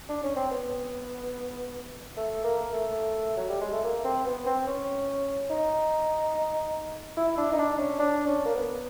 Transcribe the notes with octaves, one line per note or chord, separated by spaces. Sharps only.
D4
C#4
C4
B3
A3
A#3
A3
F#3
G3
G#3
A3
A#3
C4
B3
C4
C#4
D#4
E4
D4
D#4
D4
C#4
D4
C#4
A#3
B3